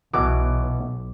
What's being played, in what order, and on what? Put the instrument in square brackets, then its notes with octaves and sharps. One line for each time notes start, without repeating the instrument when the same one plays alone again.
[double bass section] B1 [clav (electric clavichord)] B2 E3 F#3 [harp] D6